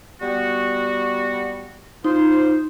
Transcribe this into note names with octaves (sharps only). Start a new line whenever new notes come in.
G3 B3 F#4
D#4 F4 C5